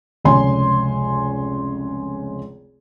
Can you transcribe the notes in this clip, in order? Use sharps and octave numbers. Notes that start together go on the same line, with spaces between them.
F1 C#2 C#5 G#5 C6